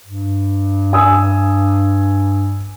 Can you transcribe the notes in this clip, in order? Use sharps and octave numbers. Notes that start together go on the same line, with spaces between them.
G2
G#5 D#6 E6